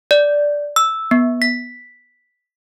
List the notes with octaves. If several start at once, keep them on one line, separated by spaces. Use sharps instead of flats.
D5
E6
B3
B6